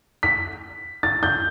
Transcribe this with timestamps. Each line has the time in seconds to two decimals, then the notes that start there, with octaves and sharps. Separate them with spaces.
0.23 B6
1.03 A6
1.23 G6